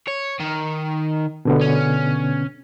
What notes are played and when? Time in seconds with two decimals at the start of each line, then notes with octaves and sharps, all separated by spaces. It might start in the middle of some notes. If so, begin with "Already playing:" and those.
0.08 C#5
0.40 D#3
1.45 B2 D3 B3
1.61 C#4